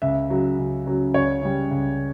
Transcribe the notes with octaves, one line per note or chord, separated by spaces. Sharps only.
C#2 E5
C#3 F#3
C#2
C#3 F#3
C#2 C#5
C#3 G3
C#2